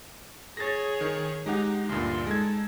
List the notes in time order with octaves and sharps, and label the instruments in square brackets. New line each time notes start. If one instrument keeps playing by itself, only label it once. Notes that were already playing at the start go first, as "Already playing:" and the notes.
[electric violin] G#4 C#5 [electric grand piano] A6 A#6
[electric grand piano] D#3
[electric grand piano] G#3 G4 F#5 [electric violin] D#4
[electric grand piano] D2 G2 A#2 [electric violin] C6
[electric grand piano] G#3 G#6 [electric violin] D#4 A4